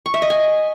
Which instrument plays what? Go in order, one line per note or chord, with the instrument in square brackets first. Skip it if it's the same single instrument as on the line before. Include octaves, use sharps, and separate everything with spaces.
[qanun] C#6
E5
D#5
G#5